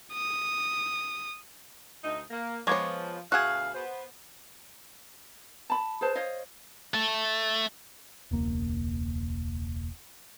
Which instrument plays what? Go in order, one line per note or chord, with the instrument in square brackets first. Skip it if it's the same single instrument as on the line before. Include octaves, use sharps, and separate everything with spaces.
[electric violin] D#6
[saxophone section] D2 D#4
A#3
[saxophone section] F3 [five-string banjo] G#3 B3 C#5 [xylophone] C#6 D6 G#6
[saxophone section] D2 B2 F5 [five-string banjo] F#4 G#4 [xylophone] F#6 G#6
[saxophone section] B3 C5
[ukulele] A5 B5
G#4 B4 C5 A5
C5 C#5 D#5 F5
[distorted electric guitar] A3
[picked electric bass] E1 C#2 A#3